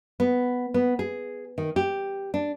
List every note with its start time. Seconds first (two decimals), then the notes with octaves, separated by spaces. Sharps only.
0.20 B3
0.74 B3
0.99 G#4
1.58 D#3
1.76 G4
2.34 D4